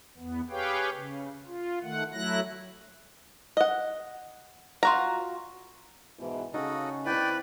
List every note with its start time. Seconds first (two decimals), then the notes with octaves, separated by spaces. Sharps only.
0.17 E2 B3
0.50 G4 G#4 B4 C#5 F5 G5
0.93 C#3
1.46 F4
1.82 D#3 A3 F#5
2.12 F#3 A3 E4 F#6 A#6
3.57 D#5 F#5
4.83 F4 F#4 A#5
6.19 G#2 B2 E3
6.54 C#3 D#4 F#4 A4 C#5 D#5 F5
7.06 C4 E4 B4 D5 G5